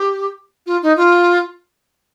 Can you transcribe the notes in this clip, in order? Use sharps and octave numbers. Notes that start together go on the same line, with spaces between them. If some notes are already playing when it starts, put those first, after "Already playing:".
Already playing: G4
F4
D#4
F4